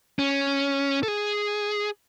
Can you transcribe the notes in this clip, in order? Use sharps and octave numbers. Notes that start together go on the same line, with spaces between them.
C#4
A4
G#4